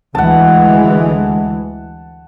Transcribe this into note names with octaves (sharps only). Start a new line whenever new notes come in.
D2 E3 G#3 F#5 A5